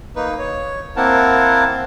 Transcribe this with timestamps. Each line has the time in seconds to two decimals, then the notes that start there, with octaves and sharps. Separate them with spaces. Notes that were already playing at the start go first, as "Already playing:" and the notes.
0.16 A#3 D#4 B4
0.39 C#5
0.97 A#3 C4 E4 A#4 F#5 A5